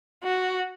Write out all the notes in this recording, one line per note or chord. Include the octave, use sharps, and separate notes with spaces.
F#4